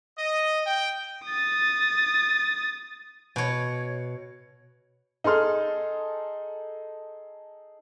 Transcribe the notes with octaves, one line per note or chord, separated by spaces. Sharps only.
D#5
G5
D#6 A6
B2 C#5
D#4 G#4 A4 C6 F6